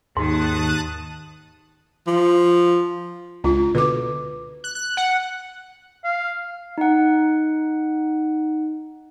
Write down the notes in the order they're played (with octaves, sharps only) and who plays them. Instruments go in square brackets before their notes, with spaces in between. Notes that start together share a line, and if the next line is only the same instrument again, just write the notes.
[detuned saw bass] D#2 [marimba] G#2 [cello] D#3 [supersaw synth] A5 D#6 F#6
[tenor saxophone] F3
[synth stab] C#2 [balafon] D4 F4
[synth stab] B2 D3 [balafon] B4 D6
[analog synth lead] F#6
F#6
F#5
[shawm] F5
[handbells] D#4 F#5